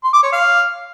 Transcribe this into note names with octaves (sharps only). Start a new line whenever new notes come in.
C6
D6
C#5
F5